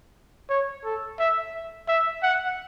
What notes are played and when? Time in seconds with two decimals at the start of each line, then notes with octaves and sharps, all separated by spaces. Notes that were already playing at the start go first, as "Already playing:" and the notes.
0.50 C#5
0.85 A4
1.19 E5
1.88 E5
2.23 F#5